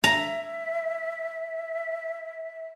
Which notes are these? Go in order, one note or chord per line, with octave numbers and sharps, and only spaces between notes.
E5 A#5